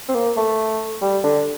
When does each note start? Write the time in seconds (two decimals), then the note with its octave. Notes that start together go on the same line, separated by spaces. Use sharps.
0.09 C4
0.14 A#3
0.36 A3
1.02 G3
1.23 D3